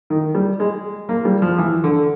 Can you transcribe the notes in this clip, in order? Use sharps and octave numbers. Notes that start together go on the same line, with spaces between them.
D#3
G3
G#3
A#3
G3
F3
E3
D3